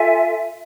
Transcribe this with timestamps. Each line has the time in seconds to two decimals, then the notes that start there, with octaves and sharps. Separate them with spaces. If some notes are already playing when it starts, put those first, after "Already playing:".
Already playing: F4 A4 E5 G#5